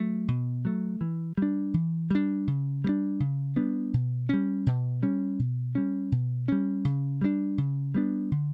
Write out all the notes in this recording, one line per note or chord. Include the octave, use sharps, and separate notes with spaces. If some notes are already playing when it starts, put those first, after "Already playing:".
Already playing: F#3 A3
B2
F#3 A3
E3
G3 D4
E3
G3 D4
C#3
G3 B3 D4
C#3
G3 B3 D4
B2
G3 C#4
B2
G3 C#4
B2
G3 C#4
B2
G3 C#4
C#3
G3 B3 D4
C#3
G3 B3 D4
D3